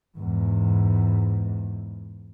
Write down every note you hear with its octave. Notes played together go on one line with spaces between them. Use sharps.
E2 G#2